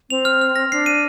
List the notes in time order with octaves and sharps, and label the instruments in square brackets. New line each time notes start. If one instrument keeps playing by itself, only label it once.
[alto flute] C4 [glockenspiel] F7
[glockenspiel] F6
F6
A#6
[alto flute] D4 [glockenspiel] C7
[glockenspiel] D#7